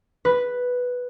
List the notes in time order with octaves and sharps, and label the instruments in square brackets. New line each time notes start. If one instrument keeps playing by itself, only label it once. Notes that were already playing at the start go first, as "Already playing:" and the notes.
[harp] B4